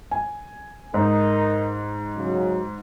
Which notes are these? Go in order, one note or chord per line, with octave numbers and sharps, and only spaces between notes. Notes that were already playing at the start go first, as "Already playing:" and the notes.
G#5
G#2 D#4 A#4
C#3 F#3